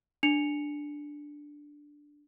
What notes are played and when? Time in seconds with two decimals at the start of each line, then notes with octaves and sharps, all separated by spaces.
0.23 D4 C#7 F7